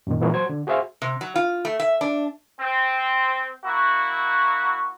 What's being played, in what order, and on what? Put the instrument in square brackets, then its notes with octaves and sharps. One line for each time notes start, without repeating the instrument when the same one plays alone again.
[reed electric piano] F#2 A#2 D#3
A#2 E3 F3 G#3 A#3 B3
F#3 C5 G#6
D3
F#4 G#4 C5 E5 F5
[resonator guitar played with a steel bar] C3
F#3
F4
A3
E5
D4
[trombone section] C4
A#3 E4 F#4